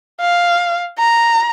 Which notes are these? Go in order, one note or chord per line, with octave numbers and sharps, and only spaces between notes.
F5
A#5